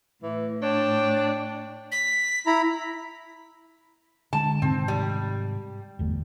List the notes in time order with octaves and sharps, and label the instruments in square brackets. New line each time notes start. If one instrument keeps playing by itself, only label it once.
[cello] A2 [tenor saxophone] E3
[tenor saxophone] D4 [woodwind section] C#5 A5 [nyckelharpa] G5
[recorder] B6
[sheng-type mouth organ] E4 A#5 B5
[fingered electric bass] D3 G#3 [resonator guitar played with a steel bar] A5
[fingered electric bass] G#2 C3 D#3 [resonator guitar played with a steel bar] C4
[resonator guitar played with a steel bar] G3
[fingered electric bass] G1 E2 A3